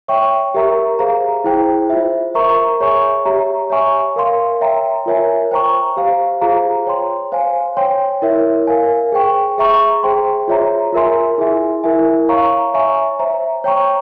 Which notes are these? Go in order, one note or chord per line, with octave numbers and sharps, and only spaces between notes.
C#5 E5 G5 C#6
G4 A#4 E5 A#5 C#6
G#4 C5 F5 A#5
E4 G#4 C5 G5
F4 C5 E5
A#4 E5 A#5 C#6
G#4 C#5 E5 G#5 C#6
G4 C#5 E5 A#5
C#5 E5 G#5 C#6
A#4 F5 C6
C#5 E5 G5 A#5
F4 A#4 C#5 E5 G#5
C5 G5 A#5 C#6
G4 C5 F5
F4 G#4 C5 F5 A#5
C#5 G5 C6
C5 F5 G#5
C#5 G5 C6
E4 A#4 C#5 E5
A#4 F5 G#5
G#4 C5 G5 C#6
G#4 E5 A#5 C#6
G#4 C5 G5 C6
F4 G#4 C#5 E5 A#5
F4 A#4 E5 G#5 C6
E4 G#4 E5 G#5
E4 A#4 E5 G#5
C#5 F5 A#5 C#6
C#5 E5 G#5 C#6
C5 E5 A#5
C#5 G5 A#5 C#6